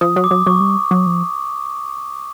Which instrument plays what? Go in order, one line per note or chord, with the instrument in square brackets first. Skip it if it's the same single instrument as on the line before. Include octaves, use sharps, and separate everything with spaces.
[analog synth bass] F3 [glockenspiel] D#6
[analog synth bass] F#3
[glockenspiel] D6
[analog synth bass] F#3
[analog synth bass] F#3 [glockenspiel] C#6
[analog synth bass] G3
F#3
F3